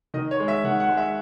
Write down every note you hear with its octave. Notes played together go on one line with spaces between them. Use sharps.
D#3 D#5
C#5
G#3
E5
D#3 F#5
F#5
G#3
E5